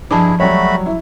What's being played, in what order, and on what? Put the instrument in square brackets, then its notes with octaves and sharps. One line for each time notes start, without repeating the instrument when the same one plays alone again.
[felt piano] G2 [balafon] F3 A5 D6 [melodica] E4 G#4
[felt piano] F#3 G3 C#5 [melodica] A3 F#4 B5
[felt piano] E4